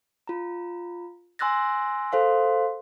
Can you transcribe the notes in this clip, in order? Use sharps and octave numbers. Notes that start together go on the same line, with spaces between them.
F4 A#5
G#5 C6 E6 F#6 A6 A#6
A4 C5 F5 C6